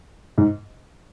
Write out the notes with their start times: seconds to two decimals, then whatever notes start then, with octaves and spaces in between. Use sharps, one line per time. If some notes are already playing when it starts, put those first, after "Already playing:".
0.38 G#2